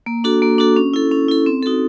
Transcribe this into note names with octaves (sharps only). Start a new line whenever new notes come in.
A#3
D4 F#4 A4
A#3
D4 F#4 A4
C#4
E4 A4
C#4
E4 A4
C4
D#4 F#4 A4